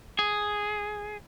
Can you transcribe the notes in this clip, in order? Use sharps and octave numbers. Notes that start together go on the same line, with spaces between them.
G#4